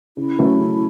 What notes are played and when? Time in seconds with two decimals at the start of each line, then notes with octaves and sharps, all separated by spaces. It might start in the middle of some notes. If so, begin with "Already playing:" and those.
0.17 C#3 E4
0.39 F#3 A3 C#4
0.59 C#3